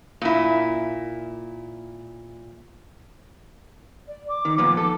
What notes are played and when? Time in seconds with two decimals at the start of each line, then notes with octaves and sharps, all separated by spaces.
0.22 A#2 E4
4.07 D5
4.28 D6
4.45 D#3
4.58 A#2 F3 B3 D6
4.77 A4